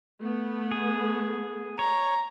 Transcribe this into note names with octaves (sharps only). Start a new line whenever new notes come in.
A3 B3
G#4
C#5 A#5